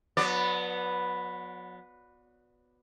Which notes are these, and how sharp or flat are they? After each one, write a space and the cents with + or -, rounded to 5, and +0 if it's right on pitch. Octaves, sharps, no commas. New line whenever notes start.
F#3 -30 B3 +0 D5 +0